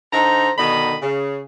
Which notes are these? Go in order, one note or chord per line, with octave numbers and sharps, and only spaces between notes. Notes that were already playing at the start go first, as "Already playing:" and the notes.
D3 D#4 C5 A#5
B2 D3 D#3 D#4 B5
C#3